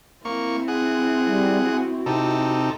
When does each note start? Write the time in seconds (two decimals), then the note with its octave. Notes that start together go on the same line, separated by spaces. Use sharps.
0.25 A#3 C4 E4 C#6
0.68 G#4 F#5
1.27 G3
1.64 F#4
2.06 C3 D#4 A4